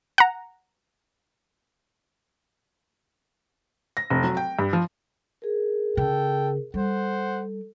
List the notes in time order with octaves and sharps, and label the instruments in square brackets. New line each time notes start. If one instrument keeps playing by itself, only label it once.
[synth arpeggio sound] F#5 A#5
[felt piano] A#6
F1
F#3
G5
G2
F3
[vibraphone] G#4 A#4
[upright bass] C#3 [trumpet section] A4 G5
[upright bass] G3 [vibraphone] A4 [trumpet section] C5 F#5